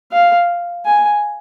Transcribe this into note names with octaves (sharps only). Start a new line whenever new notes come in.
F5
G#5